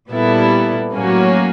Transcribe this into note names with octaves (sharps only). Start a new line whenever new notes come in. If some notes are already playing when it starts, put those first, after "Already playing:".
A#2 G3 B3 E4 A4
A2 F#3 A#3 C#4 F#4